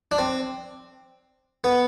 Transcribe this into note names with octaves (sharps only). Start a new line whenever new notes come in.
D4
C4
B3